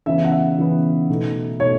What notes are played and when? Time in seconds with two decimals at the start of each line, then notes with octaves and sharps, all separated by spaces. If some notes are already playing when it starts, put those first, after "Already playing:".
0.06 C#3 E3 B3 E5
0.25 F#5
0.32 E5
0.58 C#3 E3 B3
1.09 B2 A3 D#4
1.60 B2 A3 D#4 C#5